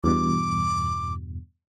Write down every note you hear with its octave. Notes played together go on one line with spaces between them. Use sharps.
E2 G2 B2 D6